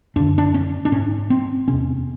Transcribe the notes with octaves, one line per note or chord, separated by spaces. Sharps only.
F#2 D3 D4
D4
C#4
D4
G#2 C#4
C4
E2 C3 C#4